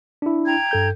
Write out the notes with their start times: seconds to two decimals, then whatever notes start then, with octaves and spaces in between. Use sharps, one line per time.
0.22 D4 E4
0.47 G5 A#5 G#6
0.71 G2 A4 G6